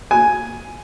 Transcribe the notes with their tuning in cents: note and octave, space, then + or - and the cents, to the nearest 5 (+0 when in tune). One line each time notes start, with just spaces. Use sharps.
G#5 +5